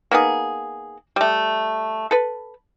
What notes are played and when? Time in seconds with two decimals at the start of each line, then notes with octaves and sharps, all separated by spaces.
0.11 A#3 B3 D#4 G#4
1.16 G3 A3
2.11 A4 B4